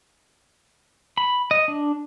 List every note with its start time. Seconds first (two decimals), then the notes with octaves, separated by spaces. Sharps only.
1.18 B5
1.51 D#5
1.68 D4